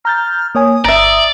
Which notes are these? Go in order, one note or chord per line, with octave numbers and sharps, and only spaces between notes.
A#5 F6 G6 A6
A#3 C#5 G#5 D#6
G1 D5 E5 A#5